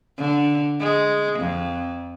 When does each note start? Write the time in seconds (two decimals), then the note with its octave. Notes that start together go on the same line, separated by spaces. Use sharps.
0.17 D3
0.80 G#3
1.39 F2